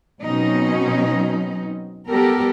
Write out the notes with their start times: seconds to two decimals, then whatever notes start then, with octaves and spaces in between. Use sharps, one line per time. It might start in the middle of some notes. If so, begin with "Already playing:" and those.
0.23 B2 F#3 C4 C#4 D#4
2.09 G3 B3 G4 A4 A#4